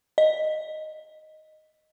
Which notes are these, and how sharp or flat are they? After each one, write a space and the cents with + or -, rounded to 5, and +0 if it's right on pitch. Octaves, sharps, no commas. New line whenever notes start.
D#5 -5